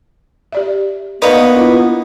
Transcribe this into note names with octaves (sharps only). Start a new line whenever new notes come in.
G4 D5 E5
A#3 B3 D#4 B4 C#5 D5 F5
D4 E4 F4